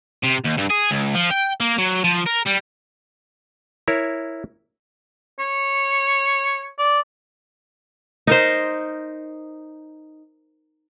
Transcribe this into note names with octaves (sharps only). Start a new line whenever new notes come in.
C3
D#2
G2
G#4
C#2
F3
G5
A#3
F#3
F3
A#4
G3
E4 A#4 C#5
C#5
D5
D#4 A#4 C5